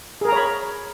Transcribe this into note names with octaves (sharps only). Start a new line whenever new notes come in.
G#4 A#4 C#5 A#5 B5